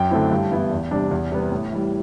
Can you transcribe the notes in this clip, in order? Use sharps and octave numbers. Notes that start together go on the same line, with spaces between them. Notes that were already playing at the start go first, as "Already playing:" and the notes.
Already playing: F#2 G5
D3 A3 C4 E4
G2
E3 B3 E4
E2
C3 G3 D4
E2
C3 G3 B3
A2
E3 G3